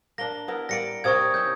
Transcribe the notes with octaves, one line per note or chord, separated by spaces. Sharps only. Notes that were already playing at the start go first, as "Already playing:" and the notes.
A#3 D4 A#6 G7
B3 E4 A#4
G3 A#3 D5 A#6 C#7 D7
C3 A#3 C#6 D#6 G#6
C#4 D#4 E4 G6